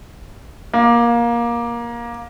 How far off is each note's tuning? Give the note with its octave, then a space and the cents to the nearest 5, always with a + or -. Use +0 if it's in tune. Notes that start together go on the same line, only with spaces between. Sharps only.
A#3 +20